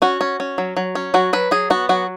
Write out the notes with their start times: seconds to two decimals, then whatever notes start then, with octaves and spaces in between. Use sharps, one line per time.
0.02 C#4 F#4
0.21 C#4
0.40 C#4
0.58 F#3
0.77 F#3
0.95 C#4
1.14 F#3 F#4
1.33 F#3 B4
1.51 F#3 G#4
1.70 B3 F#4
1.89 F#3 F#4